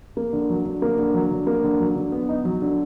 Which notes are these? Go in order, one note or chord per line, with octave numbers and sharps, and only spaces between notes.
A#3
D3
F#3
D3
A#3
D3
F#3
D3
A#3
D3
F#3
D3
B3
D#4
F#3
D3